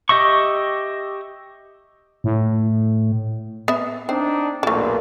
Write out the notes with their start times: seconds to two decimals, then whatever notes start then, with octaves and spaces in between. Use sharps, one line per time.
0.09 G4 D#5 E5 C#6
2.24 A2
3.68 B3 E5
4.09 C4 D4 D#4
4.63 B1 E2 A#2 A3 D4